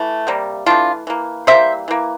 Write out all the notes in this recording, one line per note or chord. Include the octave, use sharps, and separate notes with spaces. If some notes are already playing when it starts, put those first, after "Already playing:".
Already playing: E3 A3
C3 G3 A#3
E3 A3 D4 F4
E3 A#3
E3 G3 A#3 C5 E5
E3 A#3